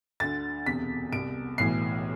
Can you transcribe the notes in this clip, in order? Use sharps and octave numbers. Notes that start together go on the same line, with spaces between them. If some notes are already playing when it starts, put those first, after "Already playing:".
D2 D3 A6
E1 E2 C3 B6
C2 B2 D7
B1 A2 E3 C7